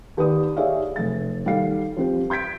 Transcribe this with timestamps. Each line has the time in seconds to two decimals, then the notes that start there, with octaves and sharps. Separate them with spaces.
0.17 D#2 G4 B4 D5 D#6
0.57 G4 G#4 C#5 D5 E5 F5
0.96 F1 A3 A6
1.45 D#3 G3 D#4 A4 F5 C7
1.97 F3 C4 G4
2.30 C6 G6 G#6 B6 D7